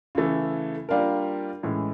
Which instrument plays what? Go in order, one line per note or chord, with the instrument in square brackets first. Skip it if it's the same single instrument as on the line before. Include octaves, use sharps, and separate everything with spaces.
[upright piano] C#3 E3 A3
G3 A#3 D4 F4 A#4
A2 E3 G#3 C#4